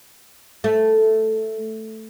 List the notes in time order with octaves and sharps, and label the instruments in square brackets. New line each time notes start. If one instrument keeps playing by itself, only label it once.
[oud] A3